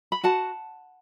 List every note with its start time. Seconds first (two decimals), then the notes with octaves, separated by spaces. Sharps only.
0.12 B5
0.23 F#4 F#5 A5